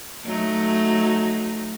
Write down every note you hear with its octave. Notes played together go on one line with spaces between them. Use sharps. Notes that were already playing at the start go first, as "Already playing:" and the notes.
F#3 A3 D#4